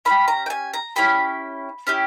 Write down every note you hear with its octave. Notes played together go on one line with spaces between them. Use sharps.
C#4 E4 G4 B5
A#5
G5
G#5
A#5
C#4 E4 G4 B5
C#4 E4 G4